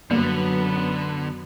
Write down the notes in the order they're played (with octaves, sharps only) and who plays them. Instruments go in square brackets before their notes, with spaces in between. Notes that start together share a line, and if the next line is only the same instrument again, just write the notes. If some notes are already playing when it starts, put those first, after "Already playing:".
[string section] F#2 B3 [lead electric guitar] D3 [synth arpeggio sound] G3 A#3